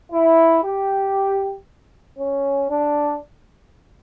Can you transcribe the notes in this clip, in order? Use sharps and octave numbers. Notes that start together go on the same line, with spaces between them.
E4
G4
C#4
D4